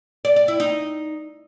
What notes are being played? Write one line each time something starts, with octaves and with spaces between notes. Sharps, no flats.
D5
D5
E4
D#4